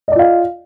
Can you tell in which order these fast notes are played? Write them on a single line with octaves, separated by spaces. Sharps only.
D#5 D5 F4 F5